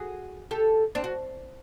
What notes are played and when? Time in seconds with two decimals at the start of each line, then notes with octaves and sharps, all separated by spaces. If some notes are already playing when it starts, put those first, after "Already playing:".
Already playing: F#4 G#4
0.51 G4 A4
0.95 C4 D4
1.04 F#4